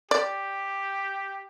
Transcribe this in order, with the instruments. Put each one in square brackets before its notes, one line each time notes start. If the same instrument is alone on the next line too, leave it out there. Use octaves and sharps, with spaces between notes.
[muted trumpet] G4 [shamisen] D5